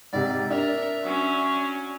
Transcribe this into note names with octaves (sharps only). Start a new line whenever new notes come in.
G#2 C3 D5
D4 A#4 E5
F#3 C#4